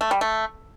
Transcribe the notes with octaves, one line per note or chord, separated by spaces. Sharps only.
A3
G3
A3